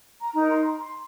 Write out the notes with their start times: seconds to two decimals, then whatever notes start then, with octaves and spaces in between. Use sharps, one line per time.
0.20 A#5
0.35 D#4 A#4 A#5
0.49 C6
0.64 A#5
0.78 C6